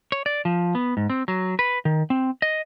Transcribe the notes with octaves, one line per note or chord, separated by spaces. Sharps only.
C#5
D5
F3
B3
G#2
C4
F#3
B4
D#3
C4
D#5